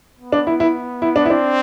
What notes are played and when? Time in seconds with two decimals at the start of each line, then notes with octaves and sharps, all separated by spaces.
0.20 B3
0.32 D4
0.47 E4
0.60 E4
1.02 E4
1.16 D4
1.26 E4
1.30 C4 D4